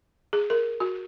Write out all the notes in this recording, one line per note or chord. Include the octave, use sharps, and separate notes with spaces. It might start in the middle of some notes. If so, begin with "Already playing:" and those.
G#4
A#4
F#4